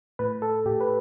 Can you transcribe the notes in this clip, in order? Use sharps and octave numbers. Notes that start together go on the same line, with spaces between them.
A2 B4
A4
A2 G4
B4